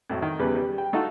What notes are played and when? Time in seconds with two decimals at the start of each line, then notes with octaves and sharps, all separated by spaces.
0.10 F2 A2 F#3
0.22 D#3
0.39 E2 C#3 G3 B4
0.55 G3
0.78 G5
0.93 A3 D#4 F4 F#4 A4 F#5